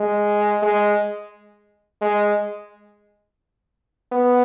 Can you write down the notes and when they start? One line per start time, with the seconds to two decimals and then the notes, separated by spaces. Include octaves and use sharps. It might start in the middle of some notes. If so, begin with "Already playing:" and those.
Already playing: G#3
0.62 G#3
2.01 G#3
4.12 B3